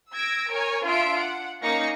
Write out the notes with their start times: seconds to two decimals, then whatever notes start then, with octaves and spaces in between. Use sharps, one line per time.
0.13 E6 G#6 A#6 D7
0.51 A#4 C#5 G#5
0.86 D4 F4 E5 D7
1.18 F#5
1.63 A#3 C#4 D#4 A#6 C#7